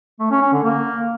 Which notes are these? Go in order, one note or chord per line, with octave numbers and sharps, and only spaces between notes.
A3
C#4
C#4
D3
A#3